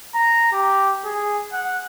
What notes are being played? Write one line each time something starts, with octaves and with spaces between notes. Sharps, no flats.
A#5
G4
G#4
F#5